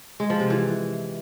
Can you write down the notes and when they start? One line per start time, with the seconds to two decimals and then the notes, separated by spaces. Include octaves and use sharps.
0.20 G#3
0.30 F3
0.40 C3
0.50 E3